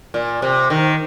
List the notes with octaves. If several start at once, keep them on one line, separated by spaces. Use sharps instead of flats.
A#2
C3
D#3